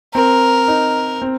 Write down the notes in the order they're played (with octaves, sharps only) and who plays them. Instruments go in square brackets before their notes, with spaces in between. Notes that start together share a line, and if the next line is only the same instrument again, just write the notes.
[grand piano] C4 [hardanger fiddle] A#4
[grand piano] D#4
C4